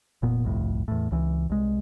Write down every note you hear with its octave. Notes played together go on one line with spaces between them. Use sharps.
F1 A#2 B3
G1 C2 F2 A2
E2 A2
C#2 E3
C2 G#3